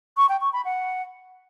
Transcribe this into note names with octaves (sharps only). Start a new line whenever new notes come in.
C#6
G5
C#6
B5
F#5